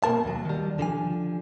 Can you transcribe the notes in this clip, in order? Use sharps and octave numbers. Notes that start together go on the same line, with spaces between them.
B2 A#3 A#4 A5
D#2 F#3
D#3 G3
D3 F3 G#5